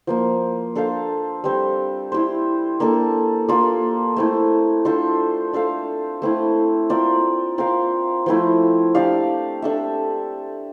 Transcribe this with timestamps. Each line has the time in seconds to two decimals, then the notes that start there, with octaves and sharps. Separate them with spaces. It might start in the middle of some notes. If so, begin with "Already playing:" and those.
0.07 F3 A#3 F4
0.75 D4 A4 C5 F5
1.44 G3 C4 G4
2.12 E4 G4 C5
2.80 A#3 D4 A4
3.48 A#3 F4 A4 D5
4.16 A3 C4 E4
4.85 D4 F4 A4 C5
5.53 D4 A4 C5 F5
6.22 A3 C4 E4
6.90 C4 F4 A#4 D5
7.58 C4 F4 A#4 F5
8.26 F3 A3 C4 E4
8.95 D4 G4 D5 F5
9.62 D4 A4 E5